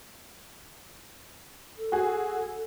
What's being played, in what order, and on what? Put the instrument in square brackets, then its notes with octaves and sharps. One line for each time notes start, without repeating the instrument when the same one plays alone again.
[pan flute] A4
[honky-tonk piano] F#4 G#4